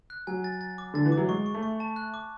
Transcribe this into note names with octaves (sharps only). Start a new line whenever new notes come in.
F#6
F#3 G#5
A6
A6
D6
D3 A6
E3
D6
F#3
G#3 C#6
C#6
A3
C#6
A5
F#6
D6